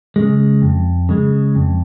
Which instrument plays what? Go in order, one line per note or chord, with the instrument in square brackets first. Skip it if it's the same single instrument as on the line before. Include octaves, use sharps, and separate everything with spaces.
[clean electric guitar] C#3 G#3
F2
C#3 G#3
F2